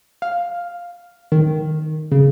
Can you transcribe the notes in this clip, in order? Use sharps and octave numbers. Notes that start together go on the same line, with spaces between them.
F5
D#3
C#3